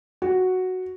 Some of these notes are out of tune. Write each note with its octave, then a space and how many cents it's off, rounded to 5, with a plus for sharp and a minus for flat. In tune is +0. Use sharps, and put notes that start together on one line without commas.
F#4 +0